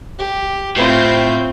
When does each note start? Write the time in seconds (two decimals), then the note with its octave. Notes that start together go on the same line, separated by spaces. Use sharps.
0.19 G4
0.76 A2 C4 E4 F4 G6